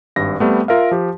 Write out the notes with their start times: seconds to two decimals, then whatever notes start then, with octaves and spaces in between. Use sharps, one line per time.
0.16 G#1 G2 A#6
0.39 G3 A3 B3 C4
0.68 F4 A#4 E5 F5
0.91 F3 G4